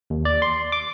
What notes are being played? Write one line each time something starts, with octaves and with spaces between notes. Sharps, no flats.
D#2
D5
C6
D6